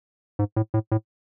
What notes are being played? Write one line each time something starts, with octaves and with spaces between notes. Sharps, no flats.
G#2
A2
A2
A2